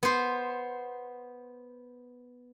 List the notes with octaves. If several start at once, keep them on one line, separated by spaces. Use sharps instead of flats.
B3 C5